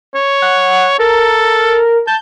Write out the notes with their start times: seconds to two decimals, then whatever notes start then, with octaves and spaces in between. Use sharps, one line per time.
0.15 C#5
0.42 F#5
0.99 A4 A#4
2.07 A5 G6